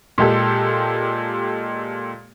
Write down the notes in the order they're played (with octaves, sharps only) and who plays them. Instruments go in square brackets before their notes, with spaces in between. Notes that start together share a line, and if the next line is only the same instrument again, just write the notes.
[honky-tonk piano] A#2 G#3 G4 A4